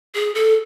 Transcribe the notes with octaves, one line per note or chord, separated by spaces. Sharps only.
G#4
A4